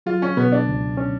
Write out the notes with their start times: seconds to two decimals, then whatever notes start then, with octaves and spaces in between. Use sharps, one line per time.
0.06 F#3 F4
0.22 C#4
0.37 B2 B3
0.52 D4
0.67 C#2
0.97 C#4